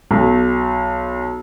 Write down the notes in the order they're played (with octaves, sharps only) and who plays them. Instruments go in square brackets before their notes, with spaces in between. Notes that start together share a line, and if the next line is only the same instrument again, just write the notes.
[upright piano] B1